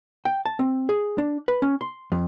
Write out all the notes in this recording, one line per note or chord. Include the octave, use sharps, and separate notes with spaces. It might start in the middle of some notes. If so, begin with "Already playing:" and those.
G5
A5
C4
G#4
D4
B4
C#4
C6
F2